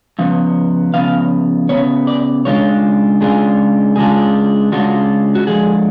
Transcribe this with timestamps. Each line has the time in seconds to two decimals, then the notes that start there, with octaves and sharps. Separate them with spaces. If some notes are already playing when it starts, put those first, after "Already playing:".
0.19 C#3 F3 B3
0.94 C#3 F3 B3 F5
1.69 C#3 F3 B3 C#5
2.07 D5
2.45 C#3 G#3 D4 F4 C#5
3.21 C#3 G#3 D4 F4 G#4
3.96 C#3 G#3 D4 F4 G#4
4.72 C#3 G#3 D4 F4 F#4
5.35 F#4
5.47 D3 F3 G#3 G#4